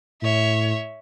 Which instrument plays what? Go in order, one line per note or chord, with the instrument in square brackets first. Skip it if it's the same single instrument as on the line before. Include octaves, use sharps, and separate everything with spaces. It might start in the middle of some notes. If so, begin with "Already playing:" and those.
[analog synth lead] A2 [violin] C#5 E5